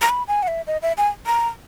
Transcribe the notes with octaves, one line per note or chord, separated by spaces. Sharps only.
A#5
B5
G#5
F#5
E5
D#5
E5
G#5
A#5